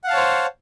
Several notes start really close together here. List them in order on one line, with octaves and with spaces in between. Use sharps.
F#5 F5 A5 C#5 C5